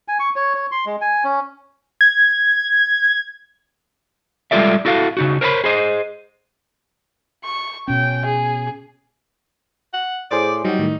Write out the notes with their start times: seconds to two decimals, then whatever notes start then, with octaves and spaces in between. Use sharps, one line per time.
0.08 G#5
0.20 C#6
0.36 C#5
0.55 C#5
0.72 C6
0.86 G#3
1.01 G#5
1.24 C#4
2.01 G#6
4.51 G3 G#3 F4 A4 D5 E5
4.85 E4 F#4 A4 D5 F5
5.17 C#3 D#4 F#4
5.41 A#4 C5 C#5 G#5 B5
5.64 G#4 C5 D#5
7.45 C#6
7.88 B2 C#4 G5
8.25 G#4
9.94 F#5
10.31 A2 G#4 C5 D5 D6
10.64 F#3 G3 D#4 F#4
10.79 A2 D#3